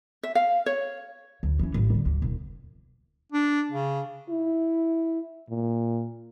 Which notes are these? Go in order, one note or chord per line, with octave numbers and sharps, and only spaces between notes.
E5
F5
C#5
D2
E3 C#4
A1 A2
D3 G3
D2
E1
D4
C#3
E4
A#2